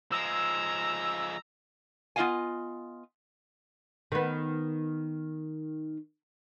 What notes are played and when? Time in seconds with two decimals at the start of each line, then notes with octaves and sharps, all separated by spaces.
0.12 F3 G#3 A#5 E6
2.16 B3 F4 G4 D#5 F5 G#5
4.12 D#3 B3